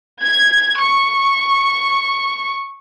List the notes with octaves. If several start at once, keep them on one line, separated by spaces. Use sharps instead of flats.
G#6
C#6